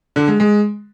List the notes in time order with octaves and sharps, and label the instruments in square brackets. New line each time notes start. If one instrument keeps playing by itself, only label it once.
[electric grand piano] D3
G#3
G#3